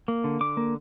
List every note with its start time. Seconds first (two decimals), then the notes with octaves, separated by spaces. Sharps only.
0.08 A#3
0.24 D3
0.41 D3 D6
0.57 A#3